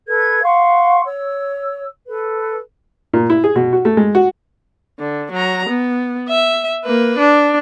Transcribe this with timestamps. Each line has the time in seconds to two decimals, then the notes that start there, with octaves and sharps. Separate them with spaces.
0.08 A4 B4 G#6
0.43 F5 F#5 C6 C#6
1.05 C#5 E6
2.07 A4 B4
3.13 A#2
3.30 E4
3.44 G#4
3.56 B2
3.73 F#4
3.85 A3
3.97 G#3
4.15 F#4
5.00 D3
5.32 F#3 A#5
5.69 B3
6.28 E5
6.85 A#3 B4
7.18 D4